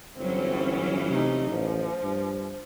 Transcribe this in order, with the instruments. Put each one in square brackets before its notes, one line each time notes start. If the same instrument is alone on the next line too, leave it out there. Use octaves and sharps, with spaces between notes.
[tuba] G1 [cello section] E3 F#3 C#4 [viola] C4
[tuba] C3 [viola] A3 D#4
[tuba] A1 [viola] F3
[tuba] G2